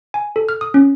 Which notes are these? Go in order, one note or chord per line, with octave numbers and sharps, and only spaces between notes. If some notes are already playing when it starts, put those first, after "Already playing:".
G#5
A4
F6
D#6
C#4